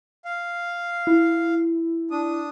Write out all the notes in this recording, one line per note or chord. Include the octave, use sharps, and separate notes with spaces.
F5
E4
D4 D#6